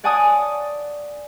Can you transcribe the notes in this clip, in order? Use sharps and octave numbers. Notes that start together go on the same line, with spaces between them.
C#5 D5 F#5 G#5 A5 D#6